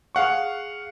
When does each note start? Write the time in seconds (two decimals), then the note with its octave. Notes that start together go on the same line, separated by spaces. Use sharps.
0.15 G#4 F5 F#5 C#6